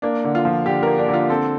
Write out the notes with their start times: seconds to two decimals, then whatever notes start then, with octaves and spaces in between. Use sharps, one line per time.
0.02 A#3 D4
0.24 D3
0.35 F4
0.45 F3
0.66 D3 G4
0.83 A#3 A#4
0.98 D4
1.08 D3
1.14 F4
1.29 C4 A4